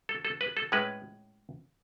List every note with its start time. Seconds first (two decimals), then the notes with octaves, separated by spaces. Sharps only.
0.09 A4
0.25 A4
0.41 B4
0.57 A4
0.72 A2 G#3 C#4 B4